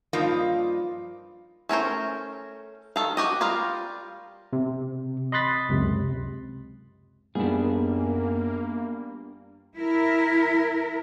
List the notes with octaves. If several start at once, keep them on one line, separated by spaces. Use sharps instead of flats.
G2 F3 A#3 D#4 F4
A3 C#4 A#4 C5
D#3 A4 F5
F#4 G4 D#5
G3 F4 A#4 F5
C3
D#5 B5 C6 F#6 A6 B6
C#2 F#2 C3
F#2 G3 A#3 B3 D4 F4 G#4
E4 A#4